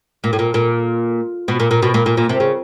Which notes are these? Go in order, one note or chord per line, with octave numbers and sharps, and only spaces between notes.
A#2
A2
A#2
A#2
B2
A#2
A#2
B2
A#2
A#2
A#2
C3
C#3